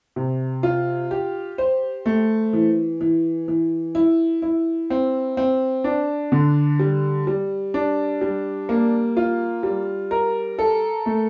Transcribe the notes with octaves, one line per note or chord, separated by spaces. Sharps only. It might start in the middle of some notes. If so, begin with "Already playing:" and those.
C3
F4
G4
C5
A3
E3
E3
E3
E4
E4
C4
C4
D4
D3
G3
G3
D4
G3
A#3
F4
G3
A#4
A4
A3